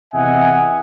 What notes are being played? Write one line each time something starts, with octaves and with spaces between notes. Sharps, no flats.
E2 C3 D#5 E5 F#5 G#5